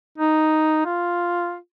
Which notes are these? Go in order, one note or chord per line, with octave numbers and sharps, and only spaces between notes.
D#4
F4